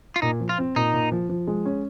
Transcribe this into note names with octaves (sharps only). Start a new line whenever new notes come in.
F4
A#2 D#4
F3
F4
C4
A#2 D#4
A#2
F3
F3
G#3
C#4